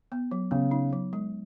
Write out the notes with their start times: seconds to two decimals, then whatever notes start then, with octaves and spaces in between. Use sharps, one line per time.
0.12 B3
0.31 F#3
0.51 C#3 B3
0.71 D#4
0.93 F#3
1.13 G#3